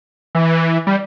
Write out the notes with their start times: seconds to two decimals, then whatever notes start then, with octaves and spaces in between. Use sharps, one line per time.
0.35 E3
0.87 G3